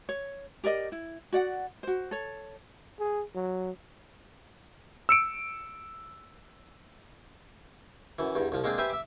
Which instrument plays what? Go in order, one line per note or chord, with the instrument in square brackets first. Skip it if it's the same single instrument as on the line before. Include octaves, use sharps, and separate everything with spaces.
[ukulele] C#5
G4 A#4 D5 D#5
E4
F#4 D5 F#5
F#4 C5
A4 C#5
[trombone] G#4
F#3
[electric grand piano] E6 C#7 D7
[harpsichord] F#2 E3
E2 G2
C2 F3
G#3 A#3 C4 D4 G#4
G4 B4 C5 E5 G#5
E5 D6